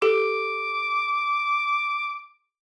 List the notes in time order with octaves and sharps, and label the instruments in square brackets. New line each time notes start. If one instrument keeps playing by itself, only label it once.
[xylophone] G4 A4 [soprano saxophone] D6